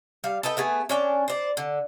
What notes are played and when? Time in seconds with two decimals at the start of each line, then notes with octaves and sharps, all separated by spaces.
0.24 G3 F5
0.43 A4 B4 D#5 G5
0.57 A3 B3 G#4
0.89 C#4 D4 G5
1.28 C5 D5
1.57 D3